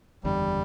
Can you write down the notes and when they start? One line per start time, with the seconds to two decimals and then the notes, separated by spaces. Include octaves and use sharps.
0.24 F#1 E2 D3 G3